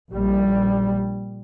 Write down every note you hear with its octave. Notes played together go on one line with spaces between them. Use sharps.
A#1 G3